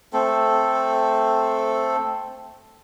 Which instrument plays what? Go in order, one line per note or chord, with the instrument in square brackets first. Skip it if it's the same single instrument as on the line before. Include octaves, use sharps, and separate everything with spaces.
[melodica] A3 C4 A4